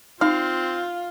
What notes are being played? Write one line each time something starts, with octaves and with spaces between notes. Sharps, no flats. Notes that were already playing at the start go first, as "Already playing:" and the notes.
C4 D#4 F4 F5